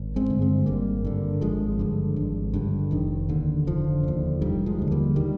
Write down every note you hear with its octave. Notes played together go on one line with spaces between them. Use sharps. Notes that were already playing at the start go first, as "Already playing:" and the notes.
Already playing: G#1
G#3 C4
G2 D3
G#3 C4
G#1 G3 A#3
G2 D3
G#1 F3 G#3
G2 D3
G#1
G2 D3
F1 D#3
D#2 D3
F1 D3 F3
D#2 D3
F1 D#3 G3
F3 G#3
D#2 D3
G3 A#3
D#3 G3